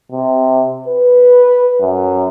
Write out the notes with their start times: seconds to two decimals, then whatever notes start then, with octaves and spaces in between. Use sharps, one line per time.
0.12 C3
0.88 B4
1.81 F#2